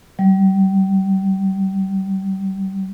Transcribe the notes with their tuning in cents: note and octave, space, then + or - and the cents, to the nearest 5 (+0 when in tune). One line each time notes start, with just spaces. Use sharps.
G3 -30